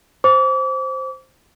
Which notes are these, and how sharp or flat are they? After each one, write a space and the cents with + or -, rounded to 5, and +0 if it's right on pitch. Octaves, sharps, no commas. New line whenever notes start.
C5 +0 D6 -35